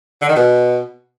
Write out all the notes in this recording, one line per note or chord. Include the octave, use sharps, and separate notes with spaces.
D3
D#3
B2